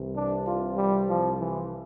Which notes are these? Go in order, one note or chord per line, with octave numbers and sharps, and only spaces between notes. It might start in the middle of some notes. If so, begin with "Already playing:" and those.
Already playing: C2 C3 E3
D4
F4
G3
F3
E3